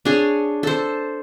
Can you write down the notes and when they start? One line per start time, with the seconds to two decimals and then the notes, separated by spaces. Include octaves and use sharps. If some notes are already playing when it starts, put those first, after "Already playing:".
0.05 D4 G#4 C#5
0.63 A4 C5